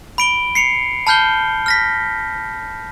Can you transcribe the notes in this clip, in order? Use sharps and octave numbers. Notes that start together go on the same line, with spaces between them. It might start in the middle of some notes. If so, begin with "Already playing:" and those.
B5 D7 G7
C7 C#7 F7
A5 B5 F6 G6 C7 G7
F6 A#6 B6